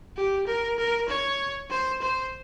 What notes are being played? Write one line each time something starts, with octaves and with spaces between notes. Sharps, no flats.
G4
A#4
A#4
C#5
C5
C5